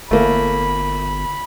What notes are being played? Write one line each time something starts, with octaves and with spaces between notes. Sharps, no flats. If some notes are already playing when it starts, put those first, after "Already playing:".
G1 A3 A#3 B5